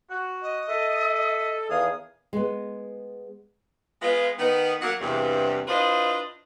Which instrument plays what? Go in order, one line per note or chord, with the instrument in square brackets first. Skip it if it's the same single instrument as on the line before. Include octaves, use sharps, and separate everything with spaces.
[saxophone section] F#4
[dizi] D#5
[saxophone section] A4 [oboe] E5
[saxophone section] E2 D#3 F5 [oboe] G#4 [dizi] D#6
[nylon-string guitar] G#3 B3
[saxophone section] G#3 B3 F4
D#3 B3 D#4
F#3 A#3 F#5
E2 G2 C3
D4 E4 F4 B4 C5 D#5